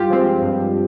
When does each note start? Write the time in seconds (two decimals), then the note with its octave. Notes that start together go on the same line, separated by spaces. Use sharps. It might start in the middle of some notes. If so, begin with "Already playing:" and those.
Already playing: G2 F4 G4
0.10 F3 G#3 C4
0.42 G2